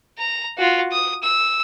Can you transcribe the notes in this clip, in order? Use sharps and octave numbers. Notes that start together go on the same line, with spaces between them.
A#5
F4 F#4
D#6
E6